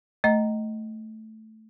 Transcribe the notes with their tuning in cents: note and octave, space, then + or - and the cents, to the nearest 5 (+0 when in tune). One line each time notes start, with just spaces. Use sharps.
A3 +0 D#5 +0 A#5 +0